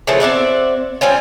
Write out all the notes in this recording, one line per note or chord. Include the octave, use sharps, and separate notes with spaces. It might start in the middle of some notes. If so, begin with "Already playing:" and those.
C#3 E3 F3 A3
C4 D5 E5 F#5
G3 C4 C#4 F4